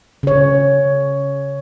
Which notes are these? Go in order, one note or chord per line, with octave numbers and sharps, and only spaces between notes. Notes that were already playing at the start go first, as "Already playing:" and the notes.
C#3 C#5